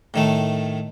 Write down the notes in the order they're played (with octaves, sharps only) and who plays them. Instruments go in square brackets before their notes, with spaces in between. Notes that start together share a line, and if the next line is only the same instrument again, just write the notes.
[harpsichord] A2 D#3 A3